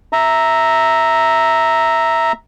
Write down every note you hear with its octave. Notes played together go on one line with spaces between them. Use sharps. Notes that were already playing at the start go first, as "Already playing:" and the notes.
E5 A#5